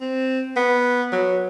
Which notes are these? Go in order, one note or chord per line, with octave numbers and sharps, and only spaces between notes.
C4
B3
F#3